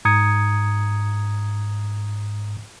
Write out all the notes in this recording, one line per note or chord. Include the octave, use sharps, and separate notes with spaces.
G#2 A#5 D#6 G#6 C#7